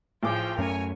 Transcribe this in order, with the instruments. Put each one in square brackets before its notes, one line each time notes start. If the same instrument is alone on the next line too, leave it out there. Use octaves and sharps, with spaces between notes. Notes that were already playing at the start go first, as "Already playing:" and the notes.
[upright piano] A1 G#4 D6 [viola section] F3 F4 G5
[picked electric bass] F#2 A3 C#4 [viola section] A#4 C#5 G#5